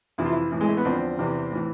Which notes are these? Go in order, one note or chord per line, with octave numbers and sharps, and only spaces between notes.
F2 C3 E3 E4
F4
E4
A2 E3
G#3
A3
B3
E2 D3 F3 C4
E2 C3 E3
A2 E3